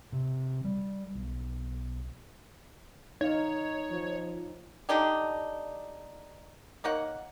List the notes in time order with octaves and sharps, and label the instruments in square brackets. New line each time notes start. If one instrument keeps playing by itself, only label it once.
[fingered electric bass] C3
G3
B1
[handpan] D#4 F5 [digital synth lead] C#5
[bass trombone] F3
[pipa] D3 D4 D#4 G4
A#3 D#4 C#5 F#5